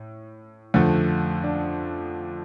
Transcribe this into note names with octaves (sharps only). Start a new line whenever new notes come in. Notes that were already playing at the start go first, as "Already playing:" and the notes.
Already playing: A2
F2 D3 F3 A3
D4